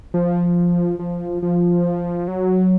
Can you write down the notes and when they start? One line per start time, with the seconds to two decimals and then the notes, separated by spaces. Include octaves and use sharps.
0.14 F3
0.99 F3
1.43 F3
2.28 F#3